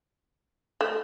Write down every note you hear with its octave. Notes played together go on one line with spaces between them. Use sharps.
A3